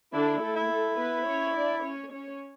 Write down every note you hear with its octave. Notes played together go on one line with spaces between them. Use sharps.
D3 D4 E4
A3 A4
E4
A3 A4
B3 B4
C#4 C#5
D4 D5
C#4 C#5
C#4 C#5